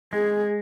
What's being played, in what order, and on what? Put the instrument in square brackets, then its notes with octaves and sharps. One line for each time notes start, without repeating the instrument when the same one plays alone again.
[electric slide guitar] G#3 [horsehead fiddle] G#4